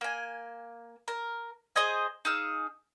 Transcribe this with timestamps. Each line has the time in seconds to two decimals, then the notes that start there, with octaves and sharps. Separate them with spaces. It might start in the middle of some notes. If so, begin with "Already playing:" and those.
0.01 A#3 G#5
1.08 A#4
1.76 G#4 C5 D#5 G#5
2.25 D#4 G#4 F5 E6